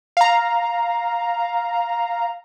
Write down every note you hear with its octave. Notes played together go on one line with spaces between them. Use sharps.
F5 A#5